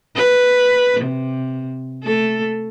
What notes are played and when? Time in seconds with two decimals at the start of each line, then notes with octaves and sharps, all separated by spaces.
0.16 B4
1.01 C3
2.04 A3 A4